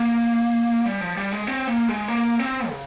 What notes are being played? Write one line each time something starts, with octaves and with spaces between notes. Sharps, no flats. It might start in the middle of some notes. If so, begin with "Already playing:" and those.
Already playing: A#3
G3
F3
G3
G#3
C4
A#3
G#3
A#3
C4
C#3